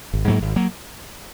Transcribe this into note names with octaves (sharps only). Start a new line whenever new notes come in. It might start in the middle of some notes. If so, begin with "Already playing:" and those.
G#1
G#2 F#3 A#3
G#1
F#3 A#3